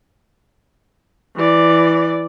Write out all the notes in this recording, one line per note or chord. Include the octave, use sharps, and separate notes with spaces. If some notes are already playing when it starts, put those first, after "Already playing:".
E3 D5